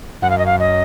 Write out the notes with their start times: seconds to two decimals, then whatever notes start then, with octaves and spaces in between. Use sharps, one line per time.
0.22 F#2 F#5
0.30 F5
0.38 D#5
0.46 F5
0.60 D#5